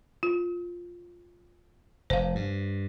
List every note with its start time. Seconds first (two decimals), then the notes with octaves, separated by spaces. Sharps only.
0.23 F4
2.10 F1 C5 F5
2.35 G2